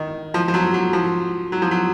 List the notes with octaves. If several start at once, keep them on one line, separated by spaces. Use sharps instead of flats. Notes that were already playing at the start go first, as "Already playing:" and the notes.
Already playing: D#3
F3
F3
F#3
F#3
F3
F#3
F3
F#3